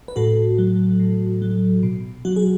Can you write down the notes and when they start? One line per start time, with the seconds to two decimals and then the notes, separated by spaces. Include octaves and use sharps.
0.08 B4
0.16 A2 F#4 A4
0.58 F#3
1.00 A2
1.42 F#3
1.83 B2
2.25 F#3 F#4
2.36 G#4